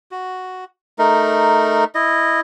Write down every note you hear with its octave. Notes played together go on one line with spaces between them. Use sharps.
F#4
A3 D#4 A#4
E4 D#5